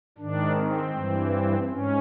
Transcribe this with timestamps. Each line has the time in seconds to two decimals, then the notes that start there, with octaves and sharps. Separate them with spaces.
0.18 G#2 D#3 D4
0.56 C4
0.94 G2 E3
1.70 G#2 C#4